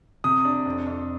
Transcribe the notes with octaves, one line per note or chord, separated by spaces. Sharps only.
C3 D#6
D4
F2
F2